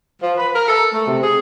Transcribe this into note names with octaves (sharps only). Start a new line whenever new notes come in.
F3
B4
A#4
A4
A3
C3
G#4